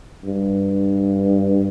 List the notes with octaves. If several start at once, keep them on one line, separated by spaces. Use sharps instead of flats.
G2